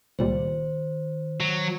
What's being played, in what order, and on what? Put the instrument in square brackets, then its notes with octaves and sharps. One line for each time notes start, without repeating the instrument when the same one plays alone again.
[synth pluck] C#2 A#2 G3 [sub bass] D#3 [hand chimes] C5
[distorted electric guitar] F#3